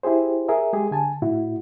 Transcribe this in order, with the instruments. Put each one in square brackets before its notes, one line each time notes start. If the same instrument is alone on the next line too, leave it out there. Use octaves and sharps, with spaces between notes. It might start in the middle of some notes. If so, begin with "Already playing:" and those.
[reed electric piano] E4 G4 G#4 C5
G#4 A#4 E5
G#3 G4 G#4
D3 G#5 A5
A2 E4 F#4